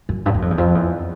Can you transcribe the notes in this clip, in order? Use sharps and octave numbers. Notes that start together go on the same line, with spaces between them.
F#2
G2
F#2
F2
E2
F2
E2